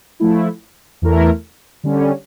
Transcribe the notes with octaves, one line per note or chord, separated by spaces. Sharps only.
F3 A3 E4
E2 E3 A3 E4 A#4
D3 G3 C#4